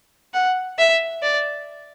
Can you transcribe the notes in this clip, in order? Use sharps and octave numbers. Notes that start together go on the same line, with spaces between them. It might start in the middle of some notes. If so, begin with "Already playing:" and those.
F#5
E5
D5